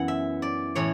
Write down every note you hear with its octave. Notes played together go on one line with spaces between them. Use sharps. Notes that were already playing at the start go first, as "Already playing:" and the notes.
Already playing: F#2 E3 B3 F#5
E5
D5
A2 E3 C#5